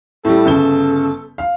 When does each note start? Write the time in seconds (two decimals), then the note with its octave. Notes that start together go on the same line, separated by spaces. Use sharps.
0.25 A2 G3 A4
0.45 G1 C#3 G7
1.38 F5